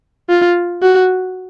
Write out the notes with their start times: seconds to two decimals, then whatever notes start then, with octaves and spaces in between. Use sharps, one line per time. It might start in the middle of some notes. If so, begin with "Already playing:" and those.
0.30 F4
0.82 F#4